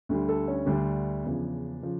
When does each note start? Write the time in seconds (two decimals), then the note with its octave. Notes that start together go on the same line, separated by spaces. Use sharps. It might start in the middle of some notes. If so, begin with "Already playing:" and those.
0.09 D2 D3 G3
0.29 A4
0.48 C#4
0.66 D2 D3 G3 D4
1.24 E2 C#3 F3
1.82 C#3 F3